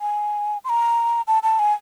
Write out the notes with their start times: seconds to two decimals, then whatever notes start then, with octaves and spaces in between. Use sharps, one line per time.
0.01 G#5
0.64 C6
0.69 A#5
1.27 A5
1.43 A5
1.59 G#5